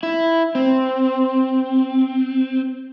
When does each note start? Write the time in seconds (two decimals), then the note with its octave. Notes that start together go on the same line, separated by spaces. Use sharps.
0.03 E4
0.55 C4